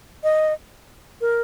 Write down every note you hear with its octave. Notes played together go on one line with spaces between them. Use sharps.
D#5
A#4